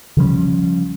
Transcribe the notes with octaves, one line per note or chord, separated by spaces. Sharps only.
C#3 F3 G3 C#4